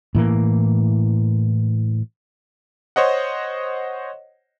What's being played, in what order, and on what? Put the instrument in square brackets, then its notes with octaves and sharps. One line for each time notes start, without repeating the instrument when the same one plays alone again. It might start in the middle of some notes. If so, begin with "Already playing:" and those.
[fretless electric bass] A2 E3 A#3
[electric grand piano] C5 C#5 D#5 F#5